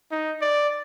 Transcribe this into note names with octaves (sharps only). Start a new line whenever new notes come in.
D#4
D5